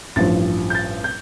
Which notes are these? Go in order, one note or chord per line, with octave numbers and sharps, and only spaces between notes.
A1 G2 F3 A6
G6
A6
G6